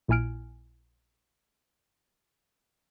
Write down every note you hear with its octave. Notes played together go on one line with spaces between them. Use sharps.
A#1 A#2 E4 G#5 F6 D7